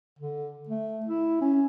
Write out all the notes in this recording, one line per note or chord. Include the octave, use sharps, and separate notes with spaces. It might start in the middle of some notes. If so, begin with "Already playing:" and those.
D3
A3
E4
C#4